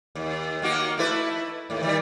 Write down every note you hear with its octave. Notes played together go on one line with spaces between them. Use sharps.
D#2
D#3 A#3 F#4
A3 E4 B4
D#2 A2
D#3 G3